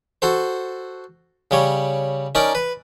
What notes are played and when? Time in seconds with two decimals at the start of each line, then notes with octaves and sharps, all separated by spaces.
0.22 F#4 A4 C5
1.51 C#3 G3 C#5
2.35 C#4 D#4 A#4 D5 A5
2.55 B4